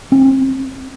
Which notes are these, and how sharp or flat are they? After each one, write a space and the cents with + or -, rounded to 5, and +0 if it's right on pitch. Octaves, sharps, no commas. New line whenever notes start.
C4 +30